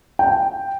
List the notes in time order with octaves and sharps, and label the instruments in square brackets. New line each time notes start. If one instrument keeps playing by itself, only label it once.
[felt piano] G5